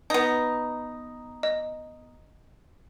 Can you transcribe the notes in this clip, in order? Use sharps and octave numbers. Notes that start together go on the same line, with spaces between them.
B3 D#4
D#5